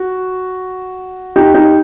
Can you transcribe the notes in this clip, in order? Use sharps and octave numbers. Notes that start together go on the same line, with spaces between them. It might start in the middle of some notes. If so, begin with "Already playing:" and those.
Already playing: F#4
D#4 G4
D#4 G4